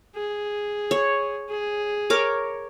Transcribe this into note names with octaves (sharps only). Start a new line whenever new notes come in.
G#4
C#5
G#4
A#4 C#5 D6